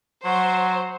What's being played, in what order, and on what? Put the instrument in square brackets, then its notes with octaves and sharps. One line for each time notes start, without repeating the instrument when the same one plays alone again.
[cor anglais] F#3 [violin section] C5 [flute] F#5